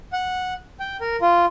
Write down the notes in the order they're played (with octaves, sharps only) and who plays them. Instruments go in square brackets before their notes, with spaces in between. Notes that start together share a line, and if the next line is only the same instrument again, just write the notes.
[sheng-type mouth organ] F#5
G5
A#4
F4